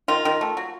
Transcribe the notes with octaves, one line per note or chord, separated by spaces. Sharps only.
D#3 F4
D#3
A3
F#3